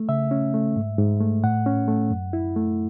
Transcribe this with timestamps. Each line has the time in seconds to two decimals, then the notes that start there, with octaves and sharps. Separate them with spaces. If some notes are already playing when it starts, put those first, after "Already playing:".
Already playing: A3
0.09 C#3 E5
0.31 C#4
0.54 A3
0.76 G#2
0.99 G#2
1.20 A3
1.44 A2 F#5
1.66 C#4
1.88 A3
2.11 F#2
2.33 E4
2.56 A3